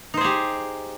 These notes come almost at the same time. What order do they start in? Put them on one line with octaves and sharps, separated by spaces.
D#4 C5 G#4 G4